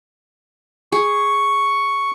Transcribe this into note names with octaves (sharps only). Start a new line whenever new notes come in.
G#4 C#6